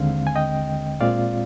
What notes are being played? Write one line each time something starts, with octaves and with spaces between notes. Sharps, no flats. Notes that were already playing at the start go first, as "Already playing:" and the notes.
Already playing: D#2 D3 G#3 C4 F5
G#5
D#5 G5
A#2 G#3 C4 F4 D5 F5